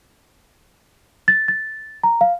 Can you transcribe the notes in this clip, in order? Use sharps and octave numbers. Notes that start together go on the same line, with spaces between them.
A6
A6
A#5
F5